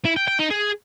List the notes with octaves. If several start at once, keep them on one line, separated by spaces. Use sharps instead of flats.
E4
G5
G5
D#4
G#4